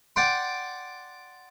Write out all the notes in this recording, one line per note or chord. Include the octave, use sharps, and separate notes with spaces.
D5 F#5 G5 C6